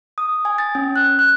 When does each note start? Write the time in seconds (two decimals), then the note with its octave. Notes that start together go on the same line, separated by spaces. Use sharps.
0.18 D#6
0.45 G#5
0.58 A6
0.75 C#4
0.96 F#6
1.19 F#6